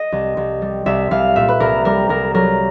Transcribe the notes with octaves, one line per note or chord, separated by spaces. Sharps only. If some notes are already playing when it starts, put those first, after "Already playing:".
Already playing: D#5
C2
C2
G3
C2 E5
C2 F5
A#2 E5
B4
C2 A#4
G3 A#4
C2 A#4
F#3 A#4